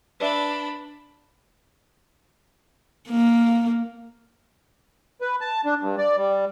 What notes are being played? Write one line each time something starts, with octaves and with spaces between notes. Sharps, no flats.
D4 B4 D5 E5 B5
A#3
B4
A5
D4
G2
D5
G3